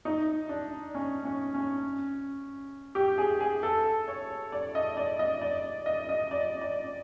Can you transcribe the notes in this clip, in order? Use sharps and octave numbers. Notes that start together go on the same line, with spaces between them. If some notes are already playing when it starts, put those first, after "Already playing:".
D#4
D4
C#4
C#4
C#4
G4
G#4
G#4
A4
C#5
D5
D#5
D5
D#5
D5
D#5
D#5
D5
D5